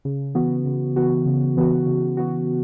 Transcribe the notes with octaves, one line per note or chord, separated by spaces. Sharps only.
C#3
E3 B3 F#4
C#3
E3 B3 F#4
C#3
E3 B3 F#4
C#3
E3 B3 F#4